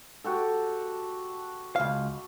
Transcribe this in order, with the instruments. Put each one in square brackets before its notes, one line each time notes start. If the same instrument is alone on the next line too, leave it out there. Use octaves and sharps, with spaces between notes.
[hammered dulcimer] F#4 G4 A4
[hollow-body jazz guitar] C#2 F5